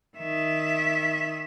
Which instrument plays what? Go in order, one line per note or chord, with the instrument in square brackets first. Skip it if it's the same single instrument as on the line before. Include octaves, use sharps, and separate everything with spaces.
[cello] D#3 E5